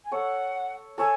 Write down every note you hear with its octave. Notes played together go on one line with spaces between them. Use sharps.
G#5
A4 C#5 F#5
A4 C#5 G#5